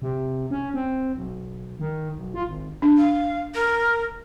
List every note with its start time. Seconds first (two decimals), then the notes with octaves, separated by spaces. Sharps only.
0.02 C3
0.51 C#4
0.74 C4
1.15 B1
1.80 D#3
2.16 B1
2.34 F4
2.47 G#1
2.82 D4
2.97 F5
3.54 A#4